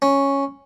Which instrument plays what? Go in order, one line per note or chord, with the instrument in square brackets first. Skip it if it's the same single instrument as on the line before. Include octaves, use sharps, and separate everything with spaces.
[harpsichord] C#4